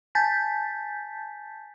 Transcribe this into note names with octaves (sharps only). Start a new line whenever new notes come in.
G#5 A5 G6 A6 B6